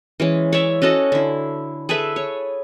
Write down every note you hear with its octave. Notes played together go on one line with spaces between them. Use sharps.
E3 G#3 C#4
C#5 D5 E5
C#4 F#4 A4 D#5
D3 E4
G#4 A4 B4 E5
C#5